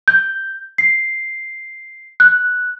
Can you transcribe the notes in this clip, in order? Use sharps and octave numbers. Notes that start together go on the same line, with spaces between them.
G6
C7
F#6